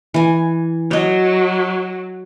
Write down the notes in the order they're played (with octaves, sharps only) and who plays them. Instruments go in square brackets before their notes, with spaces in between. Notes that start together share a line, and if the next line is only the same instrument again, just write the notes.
[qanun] E3 G#5
[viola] F#3 [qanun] C#5 D#5